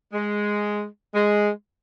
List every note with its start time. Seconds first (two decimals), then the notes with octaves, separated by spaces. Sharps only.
0.13 G#3
1.14 G#3